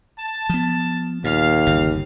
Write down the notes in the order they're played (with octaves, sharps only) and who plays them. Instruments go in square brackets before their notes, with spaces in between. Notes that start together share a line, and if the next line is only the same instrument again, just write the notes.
[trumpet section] A5
[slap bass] F3 B3
[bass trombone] D#2 [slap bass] A#2 [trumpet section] F5
[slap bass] G1 C#3